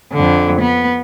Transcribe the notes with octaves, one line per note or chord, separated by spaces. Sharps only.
F2 D3
B3